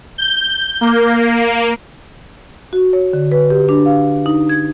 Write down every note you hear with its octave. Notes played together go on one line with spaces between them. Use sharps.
G6
A#3
F#4
C#5
D3
B4
G4
D4
F5
D#4
G#6